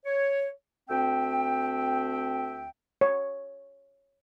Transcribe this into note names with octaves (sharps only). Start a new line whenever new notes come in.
C#5
D2 C4 E5 G5
C#5